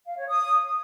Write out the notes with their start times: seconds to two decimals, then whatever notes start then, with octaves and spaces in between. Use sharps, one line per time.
0.06 F5
0.17 C#5
0.28 D#6